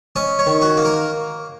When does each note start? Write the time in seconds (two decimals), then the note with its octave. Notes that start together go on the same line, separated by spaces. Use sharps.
0.16 C#4 D#5
0.39 C#5
0.46 D#3
0.62 F#4
0.77 A#3
0.85 A#4